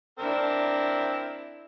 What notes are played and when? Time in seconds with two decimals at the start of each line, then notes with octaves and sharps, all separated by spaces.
0.19 C4 D4 E4 A#4